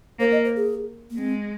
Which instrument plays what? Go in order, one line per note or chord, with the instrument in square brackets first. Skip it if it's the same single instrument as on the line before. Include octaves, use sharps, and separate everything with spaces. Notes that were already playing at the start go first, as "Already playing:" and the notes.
[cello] A#3 [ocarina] C5
[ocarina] D#5
C5
G#4
A#3
[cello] G#3 [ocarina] C4